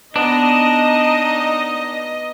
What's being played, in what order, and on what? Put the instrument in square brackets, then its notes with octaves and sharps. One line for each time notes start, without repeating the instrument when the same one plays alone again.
[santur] B3 [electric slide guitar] D4 [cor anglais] D#4 [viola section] D#5